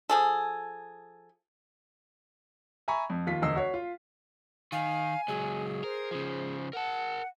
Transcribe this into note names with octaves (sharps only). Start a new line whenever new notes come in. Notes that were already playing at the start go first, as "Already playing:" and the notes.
F3 G#4 A4
E5 G#5 A#5 B5 C#6
F2
D#2 F4 B6
E1 D2 D#5 E6 C7
F#4 C#5
F4
D#3 F5 G#5
C#2 F#3 G#4
A#4 C5
C#3 F3
A#4 F#5 A5